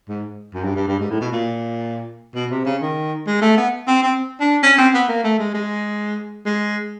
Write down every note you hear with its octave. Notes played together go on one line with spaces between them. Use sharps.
G#2
F#2
G2
G2
G2
G#2
A2
B2
A#2
B2
C3
C#3
D#3
G#3
A3
B3
C4
C4
D4
C#4
C4
B3
A#3
A3
G#3
G#3
G#3